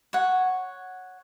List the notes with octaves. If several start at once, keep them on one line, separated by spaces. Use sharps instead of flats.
C#5 F#5